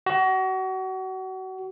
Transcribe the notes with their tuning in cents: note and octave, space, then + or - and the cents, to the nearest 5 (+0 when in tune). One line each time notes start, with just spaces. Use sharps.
F#4 +30